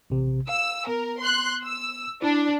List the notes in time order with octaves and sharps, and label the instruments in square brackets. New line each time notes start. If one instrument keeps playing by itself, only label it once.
[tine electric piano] A1 C3
[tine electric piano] F5 [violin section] E6
[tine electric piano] B3 [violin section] A#4
[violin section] C6 F#6
E6
[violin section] D4 [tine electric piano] E4